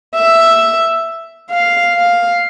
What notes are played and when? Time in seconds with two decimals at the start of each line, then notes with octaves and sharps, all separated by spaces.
0.15 E5
1.51 F5
1.96 F5